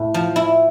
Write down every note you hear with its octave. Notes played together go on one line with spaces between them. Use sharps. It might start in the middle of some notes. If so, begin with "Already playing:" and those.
Already playing: A2 A3
F3
E4